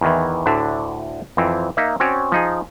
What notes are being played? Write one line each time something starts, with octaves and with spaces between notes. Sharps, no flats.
E2 D#3 E3
D2 A2 D3 D4 E5
F2 E3 C4
A#3 D#4 E5
C4 C#4 F#4 C#5 D5
F3 D#4 G#4